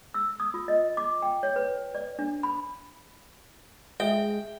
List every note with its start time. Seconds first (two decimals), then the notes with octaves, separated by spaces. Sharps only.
0.14 E6
0.40 D#6
0.54 F4
0.68 D#5
0.97 D6
1.22 G5
1.43 C#5
1.56 B4
1.95 D5
2.19 D4
2.43 B5
4.00 G#3 E5 G5